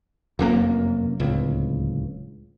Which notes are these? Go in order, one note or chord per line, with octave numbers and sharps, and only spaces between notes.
F1 F#2 B2 A#3
D1 C#2